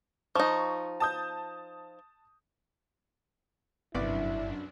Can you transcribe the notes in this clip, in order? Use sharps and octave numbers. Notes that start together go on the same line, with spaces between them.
F3 D#4 C#6
A5 D#6 G6
G1 C2 F#2 A2 B3 D4 E4 D5